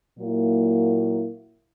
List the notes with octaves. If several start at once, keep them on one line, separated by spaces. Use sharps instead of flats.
A#2 F#3 A#3 E4